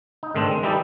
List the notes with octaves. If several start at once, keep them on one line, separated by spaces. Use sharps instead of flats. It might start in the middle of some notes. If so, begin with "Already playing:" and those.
D#4
G#2 D#3 A3 C4 D4
G#3
E3 G3 D#4 E4 G4 A4